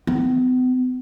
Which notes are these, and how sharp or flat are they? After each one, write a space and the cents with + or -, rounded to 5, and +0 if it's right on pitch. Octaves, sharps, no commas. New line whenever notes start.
B3 +45